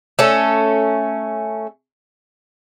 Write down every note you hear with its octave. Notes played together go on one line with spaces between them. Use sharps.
A3 C#4 A4